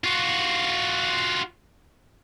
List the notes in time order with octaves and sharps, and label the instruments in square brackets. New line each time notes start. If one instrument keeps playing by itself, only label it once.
[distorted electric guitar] F4 F#4